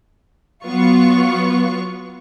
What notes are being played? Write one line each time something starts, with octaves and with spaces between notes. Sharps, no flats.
F#3 B3 F4 C#6